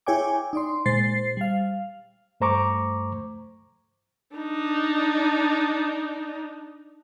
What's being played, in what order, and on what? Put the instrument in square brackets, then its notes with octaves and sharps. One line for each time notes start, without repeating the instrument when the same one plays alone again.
[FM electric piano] E4 G#4 C#5 G5 G#5 D6
D#4 D5 C6
A#2 G#3 C5 A6 C7
G3 F5
[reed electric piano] G2 A3 C5 A#5 C#6 D6
[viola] D4 D#4